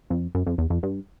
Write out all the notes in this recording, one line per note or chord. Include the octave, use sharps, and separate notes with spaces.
F2
F#2
F2
E2
F2
G2